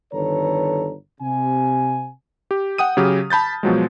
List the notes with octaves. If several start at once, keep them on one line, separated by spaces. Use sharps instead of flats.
G1 D#3 A4 B4 C#5 A#5
C3 G#5
G4
F#5 G5 D#6 D#7
C#3 F#3 G4 F6
A5 B5 G6 A6
B2 F3 F#3 G#3